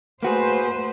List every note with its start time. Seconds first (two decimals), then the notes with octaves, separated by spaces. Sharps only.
0.23 A3 A#3 F#4 G#4 B4 C5